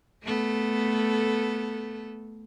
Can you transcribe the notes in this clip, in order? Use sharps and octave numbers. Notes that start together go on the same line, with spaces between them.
A3 B3 A4